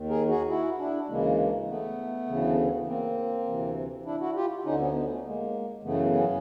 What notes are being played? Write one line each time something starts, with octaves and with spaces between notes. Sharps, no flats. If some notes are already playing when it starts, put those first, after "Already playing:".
Already playing: D#2 D#3
G#4 A#4
F#4 G#4
E4 F#4
D4 E4
D2 C#3 E3 G#3 A#3
A3 B3
D2 C#3 E3
A#3 C4
D2 C3 E3
D4 E4
E4 F#4
F4 G4
D2 D3 C#4 D#4
B3 C#4
B3 C#4
A3
G#3 A#3
F#2 C#3 E3 A3 B3
B3 C#4